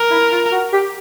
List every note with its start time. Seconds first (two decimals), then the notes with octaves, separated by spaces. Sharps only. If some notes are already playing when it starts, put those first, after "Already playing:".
Already playing: A#4
0.11 E4
0.31 F4
0.52 F#4
0.73 G4